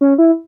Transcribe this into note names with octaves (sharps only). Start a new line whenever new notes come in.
C#4
E4